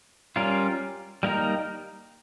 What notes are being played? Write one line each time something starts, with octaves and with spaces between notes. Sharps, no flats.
G3 C#4 F4 A#4
G3 A#3 D#4 A#4